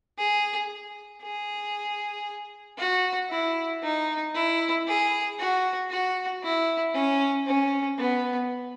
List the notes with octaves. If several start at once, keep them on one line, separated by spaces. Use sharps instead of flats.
G#4
G#4
F#4
E4
D#4
E4
G#4
F#4
F#4
E4
C#4
C#4
B3